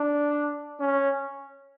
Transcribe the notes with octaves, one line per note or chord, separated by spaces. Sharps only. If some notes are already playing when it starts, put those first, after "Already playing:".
Already playing: D4
C#4